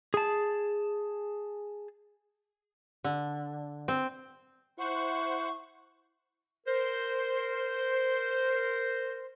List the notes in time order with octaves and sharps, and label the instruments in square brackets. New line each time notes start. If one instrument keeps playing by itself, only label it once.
[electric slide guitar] G#4 A5
[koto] D3
C4
[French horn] E4 [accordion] C5 F#5 [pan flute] C#6
[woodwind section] A#4 C5